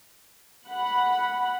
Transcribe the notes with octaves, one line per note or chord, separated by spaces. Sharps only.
F#5 B5